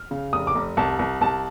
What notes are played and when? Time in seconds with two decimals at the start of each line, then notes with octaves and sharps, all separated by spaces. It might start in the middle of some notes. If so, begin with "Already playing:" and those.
Already playing: F6
0.11 C#3
0.33 F1 D#6
0.47 D6
0.55 F1
0.77 C2 A5
0.99 C2
1.21 C2 A5